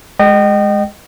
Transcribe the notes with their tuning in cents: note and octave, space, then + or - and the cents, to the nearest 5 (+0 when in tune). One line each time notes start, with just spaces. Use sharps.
G#3 +0 D#5 -30 G5 -30